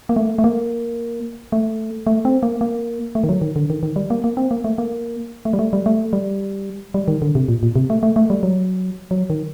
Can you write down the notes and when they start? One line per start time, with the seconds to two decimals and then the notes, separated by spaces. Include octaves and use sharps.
0.09 A#3
0.16 A3
0.38 A3
0.44 A#3
1.52 A3
2.07 A3
2.25 C4
2.43 A#3
2.61 A#3
3.15 A3
3.24 D#3
3.29 F#3
3.42 D#3
3.56 D3
3.70 D#3
3.83 D#3
3.96 G3
4.10 A#3
4.24 A#3
4.37 C4
4.51 A#3
4.64 A3
4.78 A#3
5.45 A3
5.53 G3
5.59 A3
5.73 G3
5.86 A3
6.13 G3
6.94 G3
7.08 D#3
7.22 D3
7.35 C3
7.48 A#2
7.63 A#2
7.76 C3
7.90 A3
8.03 A3
8.16 A3
8.30 G3
8.43 F#3
9.11 F#3
9.30 D#3